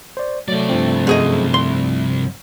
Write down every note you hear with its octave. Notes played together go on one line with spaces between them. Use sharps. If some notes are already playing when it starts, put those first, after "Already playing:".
C5 D5
C2 F#3 A3 D5
G2 F3 C4
F#2 G#4 D#5
C6